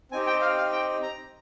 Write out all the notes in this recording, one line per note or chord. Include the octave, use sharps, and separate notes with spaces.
C4 D#4 G4 G#5
G5
F5
F5
G5
A#5